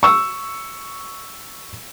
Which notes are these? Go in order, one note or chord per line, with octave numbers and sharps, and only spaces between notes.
C#6 E6